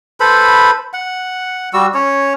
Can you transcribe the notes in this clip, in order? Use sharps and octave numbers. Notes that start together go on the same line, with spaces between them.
A4 B4 C5 B5
F#5
G3 F#4 E6
C#4 C#5